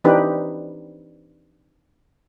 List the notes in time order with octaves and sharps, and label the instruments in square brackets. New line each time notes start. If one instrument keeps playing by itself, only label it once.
[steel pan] E3 C4 D4 D#4 G4 B4